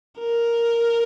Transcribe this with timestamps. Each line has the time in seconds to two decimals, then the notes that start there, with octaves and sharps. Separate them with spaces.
0.19 A#4